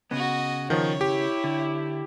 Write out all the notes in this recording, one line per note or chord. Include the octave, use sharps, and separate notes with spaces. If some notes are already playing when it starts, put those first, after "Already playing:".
C#3 B3 F#4 D#5
D#3 F3 C#5
E4 G4
D3